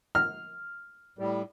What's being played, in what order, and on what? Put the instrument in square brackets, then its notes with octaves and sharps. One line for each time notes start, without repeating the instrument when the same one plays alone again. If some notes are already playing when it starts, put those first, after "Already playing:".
[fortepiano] F6
[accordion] A2 G3